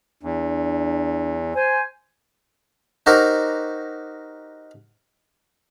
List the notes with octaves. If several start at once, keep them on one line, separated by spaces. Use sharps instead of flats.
E2 D4
C5 G#5
D#4 F#4 G4 A#4 C5